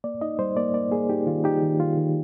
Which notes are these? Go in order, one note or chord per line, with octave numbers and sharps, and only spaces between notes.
A#3 D5
D#4 D#5
G3 C5
A#3 D5
A#3 D5
A#3 G#4
D#4 G4
D#3 F4
D#4 G4
D#3
D#3 F4
D#3